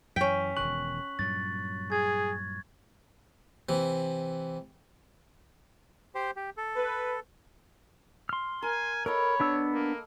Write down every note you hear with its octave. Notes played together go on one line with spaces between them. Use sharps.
F#2 E3 C#4 G5 B6
E1 B2 D#3 C#6 F#6 F#7
G2 A#2 F#3 A6
G#4 G#6
C3 E3
G4 C5
G4
A4
B4
C6 F6
A#4 G#5
A4 A#4 C#5 D#5 B5
B3 D4 E6
A#3